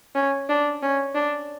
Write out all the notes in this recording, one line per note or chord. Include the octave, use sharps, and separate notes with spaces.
C#4
D4
C#4
D4